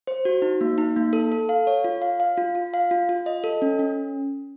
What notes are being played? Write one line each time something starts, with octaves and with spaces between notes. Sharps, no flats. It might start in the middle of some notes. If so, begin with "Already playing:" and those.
C5
F#4
D#4
A#3
D#4
A#3
A4
A4
F5
C#5
F4
F5
F5
F4
F4
F5
F4
F4
D#5
A4
C#4
C#4